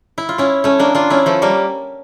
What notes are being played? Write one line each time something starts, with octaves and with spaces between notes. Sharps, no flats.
E4
F4
C#4 E4
A3 C#4
A#3 D4
D4 F4
C#4 E4
F3 A3
G3 A#3